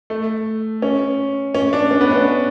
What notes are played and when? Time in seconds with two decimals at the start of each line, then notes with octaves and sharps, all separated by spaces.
0.10 A3
0.82 C#4
1.55 C#4
1.73 D4
1.91 C#4
2.01 B3
2.11 C#4